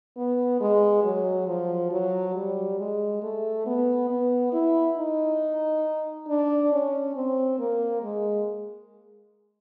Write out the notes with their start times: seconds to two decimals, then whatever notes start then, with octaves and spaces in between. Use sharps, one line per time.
0.17 B3
0.61 G#3
1.04 F#3
1.48 F3
1.91 F#3
2.35 G3
2.79 G#3
3.23 A3
3.66 B3
4.10 B3
4.53 E4
4.98 D#4
6.28 D4
6.72 C#4
7.16 C4
7.59 A#3
8.03 G#3